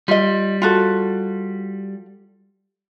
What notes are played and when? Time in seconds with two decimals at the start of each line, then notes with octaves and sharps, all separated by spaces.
0.08 G3 F4 D#5
0.62 F4 F#4 A4